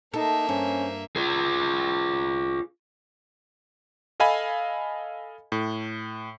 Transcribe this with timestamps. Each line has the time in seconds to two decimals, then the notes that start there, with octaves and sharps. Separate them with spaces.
0.14 A#3 D#4 A4 E5
0.49 G2 C#4 C5
1.16 F4 G#4
4.20 A4 D#5 F5 G#5 B5
5.52 A2